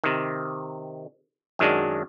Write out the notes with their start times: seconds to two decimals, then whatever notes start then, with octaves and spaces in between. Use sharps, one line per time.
0.04 C3 D#3
1.59 F#2 D#3 F#3 G#3 D4